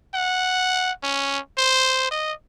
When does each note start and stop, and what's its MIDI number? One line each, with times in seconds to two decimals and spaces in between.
0.14 0.92 78
1.03 1.39 61
1.58 2.08 72
2.11 2.32 75